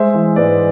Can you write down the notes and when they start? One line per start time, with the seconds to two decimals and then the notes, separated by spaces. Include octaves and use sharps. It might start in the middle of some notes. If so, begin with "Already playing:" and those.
Already playing: G#3 C5 E5
0.14 E3
0.36 G#2 B4 D5